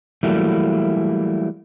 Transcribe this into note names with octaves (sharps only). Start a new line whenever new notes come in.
E3 F#3 G3 A3 A#3 E4